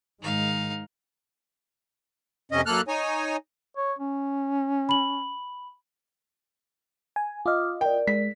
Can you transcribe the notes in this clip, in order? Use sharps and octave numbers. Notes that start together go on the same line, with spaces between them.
G#2 D#3 G#3 D#4 F5
F2 C3 C#4 D#5
F#2 A#3 A4 F6 F#6
D#4 C#5 G#5
C#5
C#4
B5 F#7
G#5
F4 D#5 D6 D#6 F6
A#4 D5 G5
G#3 B6